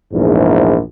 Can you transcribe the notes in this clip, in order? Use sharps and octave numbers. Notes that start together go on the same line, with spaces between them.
A#1 E2 G#2